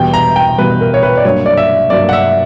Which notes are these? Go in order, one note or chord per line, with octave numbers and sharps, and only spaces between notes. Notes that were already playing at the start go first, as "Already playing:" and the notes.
Already playing: E2 B2 G3 B3 G5
A#5
G5
E2 B2 G3 B3 B4
A#4
C#5
B4
D5
G2 F#3 A#3 C#5
D5
E5
G2 F#3 A#3 D5
F#5
E5